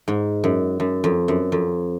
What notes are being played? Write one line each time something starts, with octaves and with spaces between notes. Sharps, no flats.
G#2
F#2
F#2
F2
F#2
F2